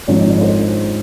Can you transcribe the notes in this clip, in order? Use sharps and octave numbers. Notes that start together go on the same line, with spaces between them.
G#1 G#2 F3 C#5
D#5
C#5
C5